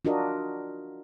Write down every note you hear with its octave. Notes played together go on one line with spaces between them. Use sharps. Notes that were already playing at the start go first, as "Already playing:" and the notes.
D4 F4 F#4 A#4 D#5